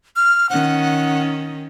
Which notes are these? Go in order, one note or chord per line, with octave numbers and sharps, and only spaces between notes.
F6
D#3 C#4 F#5